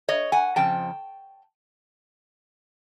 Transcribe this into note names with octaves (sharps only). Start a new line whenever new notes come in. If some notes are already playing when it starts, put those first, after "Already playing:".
C#5 D#5
F#5 G#5
F2 C#3 F3 G5 A5